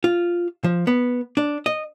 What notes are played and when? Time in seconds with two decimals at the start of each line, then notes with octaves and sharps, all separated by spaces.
0.04 F4
0.64 F3
0.87 B3
1.37 D4
1.66 D#5